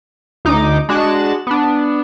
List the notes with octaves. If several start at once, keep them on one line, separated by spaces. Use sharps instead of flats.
D2 D#4 D6
G#3 D4 F#4 F#6 A6 E7
B3 D4